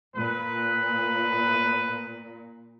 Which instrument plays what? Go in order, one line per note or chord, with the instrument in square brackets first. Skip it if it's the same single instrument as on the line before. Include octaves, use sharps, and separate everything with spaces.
[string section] A#2 [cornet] B4